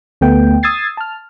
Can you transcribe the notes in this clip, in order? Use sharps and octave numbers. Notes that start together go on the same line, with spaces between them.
D2 A3 B3 G5
D#6 E6 G#6 A6 C7
A5 F6